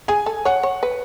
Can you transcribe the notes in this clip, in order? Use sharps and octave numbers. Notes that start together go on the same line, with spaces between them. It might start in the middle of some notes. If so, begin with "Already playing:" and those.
G#4 G#5
A4
C#5 F#5
C#5
B4